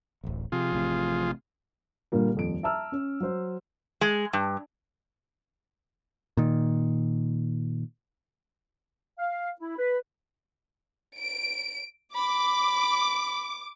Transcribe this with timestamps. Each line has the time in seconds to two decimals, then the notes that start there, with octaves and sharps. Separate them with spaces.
0.24 D1 A1
0.52 C3 F3 F4 G#4
0.72 A1 A2 C3
2.12 A#2 D3 G3 A#3
2.35 D#1 F2 D7
2.63 E5 A5 A#5 E6 F6
2.92 C#4
3.20 F#3 C5
4.01 G#3
4.33 G2
6.37 A#2 D#3
9.19 F5
9.60 E4
9.78 B4
11.19 D7
12.15 B5 D6